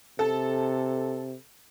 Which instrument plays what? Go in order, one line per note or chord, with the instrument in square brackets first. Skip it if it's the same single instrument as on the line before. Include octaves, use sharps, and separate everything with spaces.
[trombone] C3 [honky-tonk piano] A4